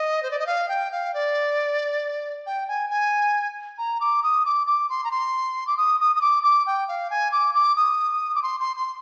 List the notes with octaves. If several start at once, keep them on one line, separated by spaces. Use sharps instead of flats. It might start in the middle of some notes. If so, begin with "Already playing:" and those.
Already playing: D#5
C5
D5
D#5
F5
G5
F5
D5
G5
G#5
G#5
A#5
D6
D#6
D6
D6
C6
A#5
C6
D6
D#6
D#6
D#6
D6
D6
G5
F5
G#5
D6
D6
D#6
D6
C6
C6
C6